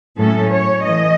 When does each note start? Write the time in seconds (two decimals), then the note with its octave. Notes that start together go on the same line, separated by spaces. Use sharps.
0.18 A2 F#3 A3 C#4 A4
0.52 C#5
0.84 E3 A3 D#5